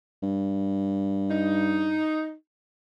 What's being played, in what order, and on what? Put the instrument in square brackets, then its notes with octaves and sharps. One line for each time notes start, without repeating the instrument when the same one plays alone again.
[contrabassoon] G2
[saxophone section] D#4